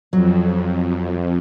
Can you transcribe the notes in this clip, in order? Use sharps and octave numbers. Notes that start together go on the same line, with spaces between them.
F2 F#3